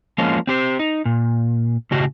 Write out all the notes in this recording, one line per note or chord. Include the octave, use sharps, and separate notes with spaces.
F3 G#3 A#3 C#4 F4
C4 G4 C5
D#4
A#2
A2 C#3 F#4 G4